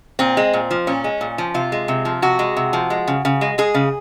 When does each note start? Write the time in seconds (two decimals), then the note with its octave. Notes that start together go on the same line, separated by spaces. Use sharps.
0.19 A#2 C4
0.37 G#3
0.53 A#2
0.71 F3
0.87 A#2 C#4
1.04 G#3
1.21 A#2
1.38 F3
1.54 C3 F4
1.72 G#3
1.88 C3
2.05 F3
2.22 C3 F#4
2.39 G#3
2.56 C3
2.73 F3
2.90 G#3
3.07 C#3
3.25 C#3
3.41 G#3
3.58 G#3 G#4
3.75 C#3